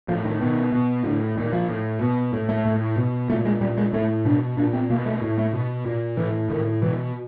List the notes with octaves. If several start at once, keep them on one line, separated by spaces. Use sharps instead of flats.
A2 F3
D#3
B2 D#3
B2
A2 D3
A#2 D#3
F3
A2
B2
A2
A3
A2
B2
A#2 A3
G#3
A#2 G3
G#3
A2 A3
B2 D4
A#2 D4
C4
B2 A#3
A3
A2
A3
B2
A#2
A2 E3
A2 D#3
B2 E3